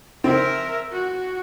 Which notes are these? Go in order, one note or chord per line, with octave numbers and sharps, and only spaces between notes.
C4 A#4 E5
F#4